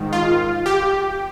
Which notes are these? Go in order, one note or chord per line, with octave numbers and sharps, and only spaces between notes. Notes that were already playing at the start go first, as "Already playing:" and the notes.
Already playing: G#2 D#3
F4
G4